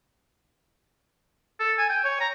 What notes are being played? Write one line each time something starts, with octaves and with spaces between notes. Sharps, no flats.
A4
G#5
G5
C#5
A#5